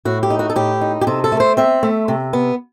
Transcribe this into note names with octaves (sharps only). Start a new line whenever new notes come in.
A2 F#4
G4
D#4
F#4
A4
A2 G4
D#4
G4
C3 A4
A4
A3
C5
C4 E5
A3
C3
B3